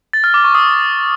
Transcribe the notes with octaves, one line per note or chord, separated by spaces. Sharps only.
A6
F6
D6
C#6
D#6